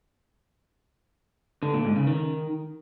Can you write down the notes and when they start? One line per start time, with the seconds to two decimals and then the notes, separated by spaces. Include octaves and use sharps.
1.63 D3
1.74 A#2
1.85 G#2
1.96 C#3
2.07 D#3